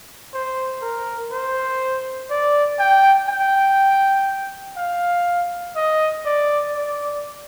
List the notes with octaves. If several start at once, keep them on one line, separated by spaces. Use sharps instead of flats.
C5
A#4
C5
D5
G5
G5
F5
D#5
D5
D5